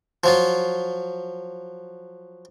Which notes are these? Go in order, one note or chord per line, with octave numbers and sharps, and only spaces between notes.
F3 F#3 F4